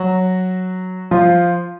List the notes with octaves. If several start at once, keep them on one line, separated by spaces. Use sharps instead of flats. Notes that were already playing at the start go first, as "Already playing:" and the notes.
Already playing: F#3 F#4
F3 F4